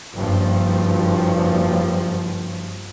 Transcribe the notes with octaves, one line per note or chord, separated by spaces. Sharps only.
F#1 G2 F3